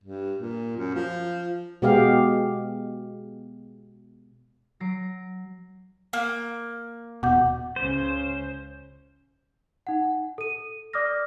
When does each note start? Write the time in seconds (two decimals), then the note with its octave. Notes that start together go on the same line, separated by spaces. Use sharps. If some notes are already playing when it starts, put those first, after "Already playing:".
0.04 G2
0.38 A#2
0.77 F#2
0.94 F3
1.82 B2 G#3 B3 G4 G#4 F5
4.80 F#3 A#6 C7 D7
6.13 A#3
7.23 D#1 B2 F#5 D6 G6
7.76 C#2 C#3 C#4 C5
9.87 D#4 F#5
10.38 A4 D#7
10.93 D5 D6 D#6 F6 A#6